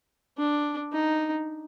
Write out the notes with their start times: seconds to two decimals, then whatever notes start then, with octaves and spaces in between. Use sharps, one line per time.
0.37 D4
0.92 D#4